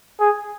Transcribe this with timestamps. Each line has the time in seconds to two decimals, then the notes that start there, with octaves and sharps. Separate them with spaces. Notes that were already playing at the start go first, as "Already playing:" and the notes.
0.20 G#4